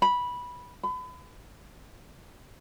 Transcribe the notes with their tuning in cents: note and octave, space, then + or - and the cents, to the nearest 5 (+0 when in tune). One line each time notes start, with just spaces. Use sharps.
B5 -10
B5 +35